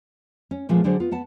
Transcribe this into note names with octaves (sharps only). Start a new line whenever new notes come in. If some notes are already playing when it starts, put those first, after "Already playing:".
C#4
A#2 F3 G#3 A3 B3 C4
D3 F#3 D4 G#4 C5
B3 F4
B3 F#5 A5